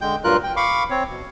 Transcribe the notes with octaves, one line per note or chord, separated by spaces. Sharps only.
D3 G#3 G5 G6
G2 A#2 F#3 F4 A#4 F#6
G5
F5 B5 C#6 D6
C4 C#5
B2